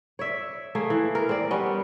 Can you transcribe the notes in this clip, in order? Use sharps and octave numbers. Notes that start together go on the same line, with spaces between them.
C#5 D5 E5
A3 A#3 G#4
E3
A#4
C4 D5
G3 B3 C#4